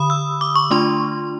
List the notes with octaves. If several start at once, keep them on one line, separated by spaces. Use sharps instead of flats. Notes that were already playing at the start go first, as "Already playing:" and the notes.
Already playing: D3 B5 D#6
E6
D6
C#6
A3 D4 F4 C6